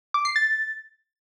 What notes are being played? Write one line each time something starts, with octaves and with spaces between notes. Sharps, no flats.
D6
C7
A6